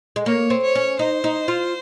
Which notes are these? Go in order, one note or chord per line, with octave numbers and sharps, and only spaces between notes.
G#3
A#3 C#5
C4
C#5
C#4
D#4 C5
D#4
F4